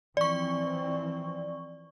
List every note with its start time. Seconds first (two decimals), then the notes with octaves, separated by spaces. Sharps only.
0.17 E3 F3 C4 D5 C#6